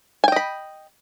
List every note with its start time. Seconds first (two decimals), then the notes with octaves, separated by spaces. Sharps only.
0.24 G#5
0.28 G5
0.32 D#5
0.36 B5